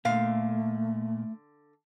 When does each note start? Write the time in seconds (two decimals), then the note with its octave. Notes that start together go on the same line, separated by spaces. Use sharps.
0.05 A#2 D3 A3 F5